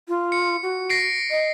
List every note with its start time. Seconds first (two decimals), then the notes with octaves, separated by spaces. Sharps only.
0.08 F4
0.32 C#7
0.63 F#4
0.90 A#6 C7 D7
1.31 D#5